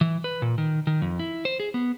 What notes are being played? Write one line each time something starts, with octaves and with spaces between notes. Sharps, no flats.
E3
B4
A#2
D#3
D#3
F2
E4
C5
G#4
B3